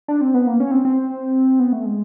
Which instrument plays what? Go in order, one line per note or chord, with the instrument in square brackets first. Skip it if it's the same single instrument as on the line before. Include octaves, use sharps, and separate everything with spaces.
[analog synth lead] D4
C4
B3
A#3
C#4
C4
C4
B3
A3
G#3